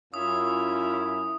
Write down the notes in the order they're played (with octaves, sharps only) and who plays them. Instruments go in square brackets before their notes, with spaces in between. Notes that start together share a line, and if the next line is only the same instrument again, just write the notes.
[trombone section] F#2 C#4 E4 [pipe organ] F4 C#5 E5 [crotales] D#6